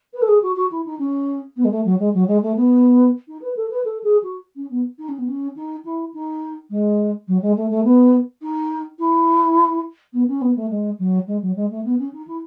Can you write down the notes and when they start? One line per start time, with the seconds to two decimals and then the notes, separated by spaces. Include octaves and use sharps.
0.13 B4
0.22 A4
0.28 G#4
0.42 F#4
0.56 F#4
0.71 E4
0.85 D#4
0.99 C#4
1.56 B3
1.64 G#3
1.71 A3
1.85 F#3
1.99 G#3
2.14 F#3
2.27 G#3
2.42 A3
2.56 B3
3.28 D#4
3.41 B4
3.56 A4
3.70 B4
3.85 A4
4.03 G#4
4.23 F#4
4.55 C#4
4.70 B3
4.98 D#4
5.08 C#4
5.18 B3
5.28 C#4
5.56 D#4
5.85 E4
6.14 D#4
6.70 G#3
7.28 F#3
7.42 G#3
7.56 A3
7.70 A3
7.84 B3
8.42 D#4
8.99 E4
10.13 B3
10.28 C#4
10.41 B3
10.56 A3
10.70 G#3
10.99 F#3
11.27 G#3
11.42 F#3
11.56 G#3
11.70 A3
11.84 B3
11.98 C#4
12.13 D#4
12.27 E4